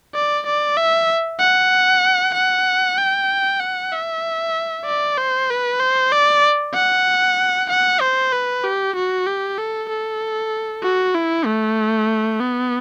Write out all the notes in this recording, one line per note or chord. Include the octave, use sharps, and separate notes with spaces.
D5
D5
E5
F#5
F#5
G5
F#5
E5
D5
C5
B4
C5
D5
F#5
F#5
C5
B4
G4
F#4
G4
A4
A4
F#4
E4
A3
B3